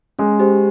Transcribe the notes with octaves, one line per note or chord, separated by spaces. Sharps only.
G#3 C#4
G4 C5